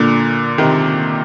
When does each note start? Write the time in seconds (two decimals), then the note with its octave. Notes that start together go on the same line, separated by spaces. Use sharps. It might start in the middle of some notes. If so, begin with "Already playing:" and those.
Already playing: A#2 D3
0.58 C3 D#3